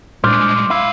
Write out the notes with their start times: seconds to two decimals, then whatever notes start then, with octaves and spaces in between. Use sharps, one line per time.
0.24 A#2 G3 G#3 D4 C5 C6 D6 F6
0.70 A2 E4 F5